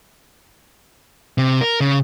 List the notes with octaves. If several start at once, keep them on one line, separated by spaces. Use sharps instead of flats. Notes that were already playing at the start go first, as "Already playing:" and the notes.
C3
A#4
C#3